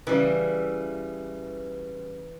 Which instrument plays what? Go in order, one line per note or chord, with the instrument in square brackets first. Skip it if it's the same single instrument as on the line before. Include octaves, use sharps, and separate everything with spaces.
[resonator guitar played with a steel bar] C#3 G3 [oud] E3